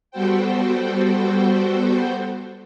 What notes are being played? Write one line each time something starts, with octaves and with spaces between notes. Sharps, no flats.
G3 B3 F#4 A4 C5 G5